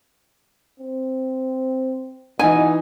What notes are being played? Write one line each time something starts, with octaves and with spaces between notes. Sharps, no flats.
C4
B2 E3 D#4 G#5